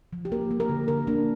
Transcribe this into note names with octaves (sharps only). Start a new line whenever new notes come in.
F3
G4
A#3 A#4
A#3
A#4
D3
D3 A#4
A#3 D4